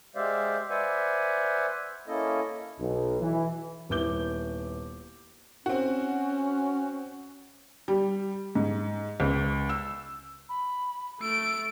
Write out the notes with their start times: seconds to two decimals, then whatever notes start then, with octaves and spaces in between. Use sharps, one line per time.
0.16 G#3 G4 C5 D5 E5 F5
0.70 B4 C5 D5 E5 F#5 G#5
2.08 A#3 C#4 E4 A4 D#5
2.79 B1
3.21 E3
3.89 D#1 B3 E4 D6 G6 G7
5.66 C4 C#4 F#4
7.88 G3
8.55 G#2
9.20 C#2
9.69 E6
10.49 B5
11.21 A3 E6 D7